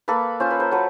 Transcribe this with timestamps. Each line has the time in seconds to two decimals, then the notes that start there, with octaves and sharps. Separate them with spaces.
0.08 A#3 A4 B4
0.40 C#4 F4 C5
0.51 B4
0.60 A#4 C5
0.71 F#3 A4 B4